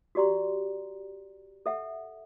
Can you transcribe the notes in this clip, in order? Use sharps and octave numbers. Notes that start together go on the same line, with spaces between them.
F#4 G4 D5 A#5 C6
A4 E5 F#5